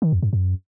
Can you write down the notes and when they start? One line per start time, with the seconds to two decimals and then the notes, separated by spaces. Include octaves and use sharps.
0.02 D#3
0.12 F2
0.23 G2
0.33 F#2